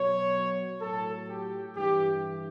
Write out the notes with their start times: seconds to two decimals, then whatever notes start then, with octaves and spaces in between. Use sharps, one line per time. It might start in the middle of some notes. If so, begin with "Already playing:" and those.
Already playing: B2 F#3 C#5
0.81 A2 F#3 A4
1.28 G4
1.75 G2 E3 G4